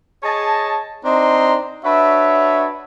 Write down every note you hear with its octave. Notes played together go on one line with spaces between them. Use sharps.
G#4 C#5 D#5 A5
C4 D4 D#4 D#5 A#5 C6
D4 F#4 B4 C#5 E5